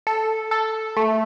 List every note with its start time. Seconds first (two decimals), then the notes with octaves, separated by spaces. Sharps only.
0.07 A4
0.51 A4
0.97 A3